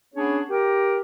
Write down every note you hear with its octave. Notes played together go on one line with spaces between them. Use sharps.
B3 C#4 D4 G#4 C#5
G4 A#4